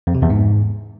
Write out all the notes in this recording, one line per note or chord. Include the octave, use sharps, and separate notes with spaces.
F2
C3
E2
G#2